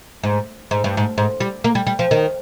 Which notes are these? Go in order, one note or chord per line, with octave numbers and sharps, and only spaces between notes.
G#2
G#2
G2
G#2
G#2
G3
A#3
G3
G3
F3
D#3